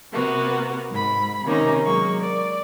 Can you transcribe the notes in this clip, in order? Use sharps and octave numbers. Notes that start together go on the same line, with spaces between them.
C3 A#3 B3 F#4
G#2 B5
C3 D#3 A#3 C#4 D#4
F#3 G#3 A#3 C#6
D5